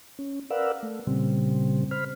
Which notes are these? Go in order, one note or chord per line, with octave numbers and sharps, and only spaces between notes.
C#4
A#4 B4 D5 F5 F#5 E6
A3
A#2 C#3 G3 C4
C5 B5 F6